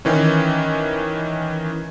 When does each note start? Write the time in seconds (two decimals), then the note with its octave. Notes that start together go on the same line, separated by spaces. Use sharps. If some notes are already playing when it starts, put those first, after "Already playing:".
0.05 D#3 E3 C#4